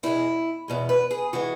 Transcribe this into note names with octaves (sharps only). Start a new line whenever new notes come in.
E2 B2 G#3 E4
E2 B2 G#3
B4
G#4
E3 G#3 F#4